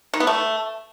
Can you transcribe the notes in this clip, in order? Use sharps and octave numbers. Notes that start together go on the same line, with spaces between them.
D#3
B3
A3